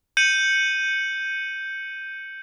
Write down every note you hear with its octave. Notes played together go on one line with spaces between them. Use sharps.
G6 C#7 D#7 F#7